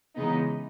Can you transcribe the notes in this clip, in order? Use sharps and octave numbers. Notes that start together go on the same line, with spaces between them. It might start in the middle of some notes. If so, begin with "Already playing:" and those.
C#3 E3 G#3 B3 D#4